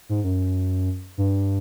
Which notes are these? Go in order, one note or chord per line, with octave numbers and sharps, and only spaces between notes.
G#2
F#2
G2